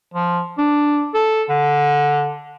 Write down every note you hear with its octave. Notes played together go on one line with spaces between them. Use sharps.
F3
D4
A4
D3